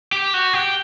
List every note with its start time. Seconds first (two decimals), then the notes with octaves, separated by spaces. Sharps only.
0.12 G4
0.34 F#4
0.53 G4